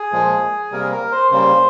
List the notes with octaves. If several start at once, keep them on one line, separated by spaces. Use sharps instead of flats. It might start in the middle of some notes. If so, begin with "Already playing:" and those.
Already playing: G#4
A#2 F3 G#3
C3 G3 A#3 A#4
A#4
C5
C#3 G3 A#3 C5